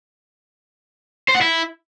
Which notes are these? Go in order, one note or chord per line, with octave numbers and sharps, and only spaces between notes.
C5
F#5
E4